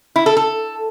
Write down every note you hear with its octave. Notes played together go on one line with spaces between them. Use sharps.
E4
A4
A4